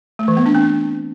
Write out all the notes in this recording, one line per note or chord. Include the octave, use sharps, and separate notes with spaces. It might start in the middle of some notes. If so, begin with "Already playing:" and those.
A3
E3
B3
D4
C4